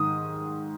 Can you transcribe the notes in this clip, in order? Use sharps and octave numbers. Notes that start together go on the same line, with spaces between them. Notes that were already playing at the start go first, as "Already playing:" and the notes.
Already playing: G#2 D#3 D#6